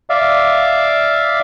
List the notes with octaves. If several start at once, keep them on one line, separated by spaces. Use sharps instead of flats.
D5 E5 F5